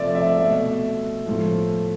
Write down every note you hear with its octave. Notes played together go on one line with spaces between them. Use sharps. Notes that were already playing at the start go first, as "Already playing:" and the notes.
Already playing: C3 F3 A3 D5 E5
E5
B2 A3 E5
A2 F3 A3